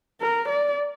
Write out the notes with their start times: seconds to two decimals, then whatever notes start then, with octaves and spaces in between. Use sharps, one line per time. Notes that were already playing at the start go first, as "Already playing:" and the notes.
0.21 A#4
0.49 D5